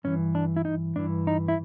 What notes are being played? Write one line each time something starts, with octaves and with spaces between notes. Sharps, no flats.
G2 E3 C#4
D4
E4
D#4
G2 E3 D4
D#4
E4